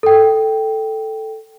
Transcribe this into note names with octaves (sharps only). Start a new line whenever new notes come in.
A4 G5